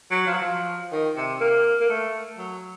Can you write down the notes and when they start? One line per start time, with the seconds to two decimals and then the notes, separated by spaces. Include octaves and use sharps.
0.11 F#3
0.27 F3
0.33 F#3
0.41 F3
0.92 D#3
1.17 C3
1.40 A#3
1.80 A#3
1.89 A3
2.38 F#3